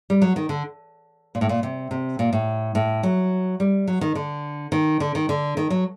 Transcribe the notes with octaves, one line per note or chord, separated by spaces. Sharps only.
G3
F#3
D#3
D3
A#2
A2
A#2
C3
C3
A#2
A2
A2
F#3
G3
F#3
D#3
D3
D#3
D3
D#3
D3
D#3
F#3